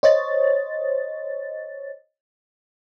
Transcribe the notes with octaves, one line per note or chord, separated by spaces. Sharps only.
C5 C#5 D#5 A6